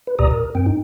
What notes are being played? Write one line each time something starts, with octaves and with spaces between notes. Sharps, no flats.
B4
D2 A#2 G4 D5 A#5 D#6
A#4
G2 C4 G5
D#4